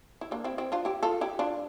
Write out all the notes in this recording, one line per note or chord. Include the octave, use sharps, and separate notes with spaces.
E4
A#3 D4
C4 E4
C4 E4
D4 F4
E4 G4
F4 A4
E4 G4
D4 F4